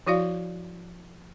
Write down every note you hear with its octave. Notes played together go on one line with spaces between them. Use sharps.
F3 E4 F#4 D5 F5